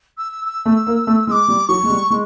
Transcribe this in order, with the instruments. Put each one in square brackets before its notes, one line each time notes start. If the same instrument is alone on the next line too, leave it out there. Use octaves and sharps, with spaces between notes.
[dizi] E6
E6
[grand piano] A3
A#3
A3
[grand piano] G#3 [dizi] E6
[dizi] D6
[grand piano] G3
[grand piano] F#3 [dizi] C#6
[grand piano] G#3
G3
[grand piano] G#3 [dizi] C#6